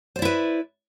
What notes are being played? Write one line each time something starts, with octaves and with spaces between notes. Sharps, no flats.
E4 B4 C5 D5